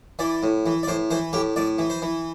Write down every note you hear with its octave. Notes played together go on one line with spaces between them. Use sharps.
E3 D5
A2
E3
D5
A2 C5
E3 C5
A2 G4
A2 D5
E3
C5
E3